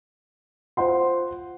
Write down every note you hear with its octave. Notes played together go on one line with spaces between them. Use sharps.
F4 C5 F#5 C6